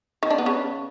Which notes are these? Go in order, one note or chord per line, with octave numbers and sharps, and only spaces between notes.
D#3
D4
B3
C#3